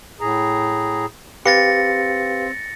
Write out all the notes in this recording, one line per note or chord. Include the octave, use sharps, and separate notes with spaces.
A2 G#4 A#5
C4 G4 B4 F5 A6 A#6 C#7